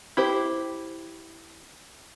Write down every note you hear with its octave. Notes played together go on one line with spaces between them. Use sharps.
E4 G4 C5